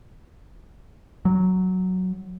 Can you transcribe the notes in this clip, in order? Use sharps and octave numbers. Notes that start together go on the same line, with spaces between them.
F#3